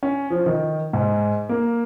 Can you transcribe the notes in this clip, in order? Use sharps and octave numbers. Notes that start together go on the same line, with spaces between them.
C#4
F3
D#3
G#2
A#3